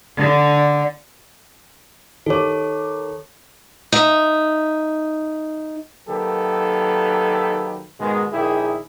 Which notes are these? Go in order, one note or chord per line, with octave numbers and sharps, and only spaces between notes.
D3
D#3 G4 A4 C#5 D6
D#4 E5
D#3 F#3 A#3 G4 A4 B4
G#2 B2 D#3 G#3
A#1 D#3 E4 G4 G#4